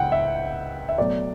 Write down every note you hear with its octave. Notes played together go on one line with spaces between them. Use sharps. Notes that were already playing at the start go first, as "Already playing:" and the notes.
Already playing: C#2 F#5 G5
E5
E5
B2 F#3 A3 D5